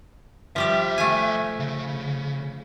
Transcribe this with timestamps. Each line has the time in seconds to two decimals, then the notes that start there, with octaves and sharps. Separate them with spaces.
0.56 B1 F3 G3 G4 E5
0.98 A3 G#5
1.60 C#3